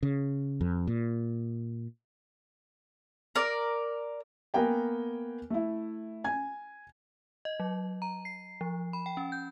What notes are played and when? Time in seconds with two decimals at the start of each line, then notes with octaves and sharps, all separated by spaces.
0.03 C#3
0.61 F2
0.87 A#2
3.36 A#4 D5
4.54 A#3 B3 A#4 G5 G#5
5.50 A3 E4
6.24 G#5 G#6
7.45 D#5
7.60 F#3
8.02 A#5
8.25 C7
8.61 F3
8.93 B5
9.06 G5
9.17 C#4
9.32 G6